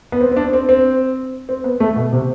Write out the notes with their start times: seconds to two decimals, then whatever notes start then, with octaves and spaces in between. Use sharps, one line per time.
0.12 B3
0.21 C4
0.32 C4
0.37 D4
0.53 C4
0.69 C4
1.49 C4
1.64 B3
1.80 A3
1.96 B2
2.13 C3